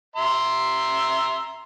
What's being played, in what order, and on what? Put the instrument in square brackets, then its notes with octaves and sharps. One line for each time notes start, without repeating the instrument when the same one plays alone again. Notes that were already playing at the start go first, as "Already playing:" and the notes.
[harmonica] E5 A#5 C6